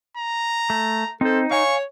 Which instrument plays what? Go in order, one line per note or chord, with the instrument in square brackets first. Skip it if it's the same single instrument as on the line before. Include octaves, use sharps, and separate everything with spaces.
[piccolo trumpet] A#5
[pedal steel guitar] A3
[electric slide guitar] C4 C5 [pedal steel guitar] D#4 [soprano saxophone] A4
[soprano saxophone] C#5 [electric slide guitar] F5 G#5 [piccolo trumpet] C#6